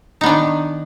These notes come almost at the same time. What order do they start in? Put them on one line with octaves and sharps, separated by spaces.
D#4 B3 D4 D#3